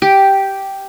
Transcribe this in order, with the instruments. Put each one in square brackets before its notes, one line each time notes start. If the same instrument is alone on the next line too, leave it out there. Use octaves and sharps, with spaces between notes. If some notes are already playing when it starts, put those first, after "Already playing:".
[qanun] G4